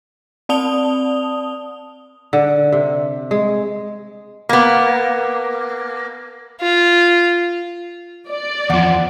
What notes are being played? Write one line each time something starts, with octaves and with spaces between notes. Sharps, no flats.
C4 D5 A5 D#6 F7 G7
D3
C3
G#3
A#3 B3
F4
D5
E2 F3 F#5